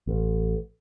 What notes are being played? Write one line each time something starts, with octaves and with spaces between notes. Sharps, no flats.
A1